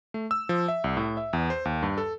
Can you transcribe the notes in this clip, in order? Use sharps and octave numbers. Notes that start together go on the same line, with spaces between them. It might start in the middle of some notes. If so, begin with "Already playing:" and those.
A3
E6
F3
E5
C2
A2
E5
E2
C5
D#2
G2
A4